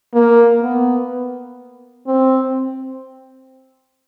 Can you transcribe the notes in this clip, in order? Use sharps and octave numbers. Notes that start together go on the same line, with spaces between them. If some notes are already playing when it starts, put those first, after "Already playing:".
A#3
B3
C4